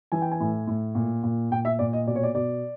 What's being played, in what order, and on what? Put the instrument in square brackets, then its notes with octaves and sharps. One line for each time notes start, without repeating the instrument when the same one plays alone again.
[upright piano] E3 G#5
G5
G#5
A2
A2
A#2
A#2
A#2 G5
E5
A#2 D5
D#5
B2 D5
C#5
D5
B2 D5